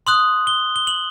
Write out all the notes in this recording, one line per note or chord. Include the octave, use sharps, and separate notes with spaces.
C6 D#6 F#6 F#7
G7
G7
F#7